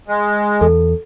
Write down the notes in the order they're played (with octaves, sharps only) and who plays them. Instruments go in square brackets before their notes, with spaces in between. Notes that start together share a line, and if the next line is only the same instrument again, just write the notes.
[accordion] G#3
[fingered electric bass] E2 [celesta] A4